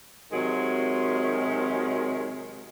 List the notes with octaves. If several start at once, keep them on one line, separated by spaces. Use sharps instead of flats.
C3 D#3 F#3 G#3